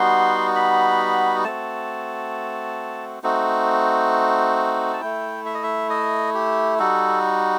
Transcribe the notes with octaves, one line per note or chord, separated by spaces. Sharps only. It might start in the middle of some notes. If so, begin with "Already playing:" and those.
Already playing: G3 B3 D#4 F#4 C6
B5
A3 C4 F#4 A5
A3 C4 D#4 F#4
A5
A3 E4 G5
E5
D#5
E5
D#5
G4
G3 D#4 F#4 A4